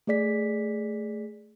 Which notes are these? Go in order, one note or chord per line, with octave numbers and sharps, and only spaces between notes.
A3 G#4 D5 B6